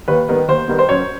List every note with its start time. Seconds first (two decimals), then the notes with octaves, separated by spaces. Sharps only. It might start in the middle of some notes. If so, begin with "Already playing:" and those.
0.08 D#2 B4
0.28 D#3 G3 B3
0.48 D#2 C5
0.68 D#3 G3 B3
0.79 C5
0.89 F#2 C#5